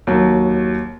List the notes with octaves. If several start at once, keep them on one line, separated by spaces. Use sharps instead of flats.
D#2 F#3